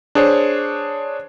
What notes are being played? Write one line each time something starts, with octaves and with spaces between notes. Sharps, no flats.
D4 G#4 C5 C#5